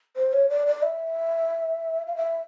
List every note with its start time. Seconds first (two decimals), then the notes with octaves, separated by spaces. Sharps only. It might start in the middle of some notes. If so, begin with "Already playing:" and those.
0.16 C5
0.33 C#5
0.50 D5
0.67 D5
0.83 E5
2.07 F5
2.16 E5